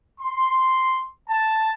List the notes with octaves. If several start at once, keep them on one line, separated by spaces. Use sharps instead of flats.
C6
A5